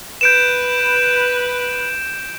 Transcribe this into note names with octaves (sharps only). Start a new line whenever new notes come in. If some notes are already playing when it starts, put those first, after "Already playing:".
B4 G6 D7 E7